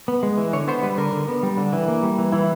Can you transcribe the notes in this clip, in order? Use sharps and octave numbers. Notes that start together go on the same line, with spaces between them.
B3
G#3
E3
D3 C#5
B3 C5
G3 B4
D3 A#4
D3
B3
G3
D3
E3
A#3
G3
E3
E3 E4